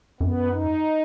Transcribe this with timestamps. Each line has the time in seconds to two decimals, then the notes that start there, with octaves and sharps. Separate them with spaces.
0.20 F#2 B3
0.51 D#4